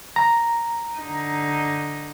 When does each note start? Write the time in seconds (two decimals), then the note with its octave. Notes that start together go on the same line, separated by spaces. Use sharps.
0.16 A#5
0.98 D3 D#4